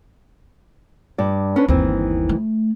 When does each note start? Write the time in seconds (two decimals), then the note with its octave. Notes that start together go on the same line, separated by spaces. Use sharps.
1.18 G2 D5
1.56 C#4 D4 B4
1.68 G1 D#2 D#3 E3 C4
2.29 A3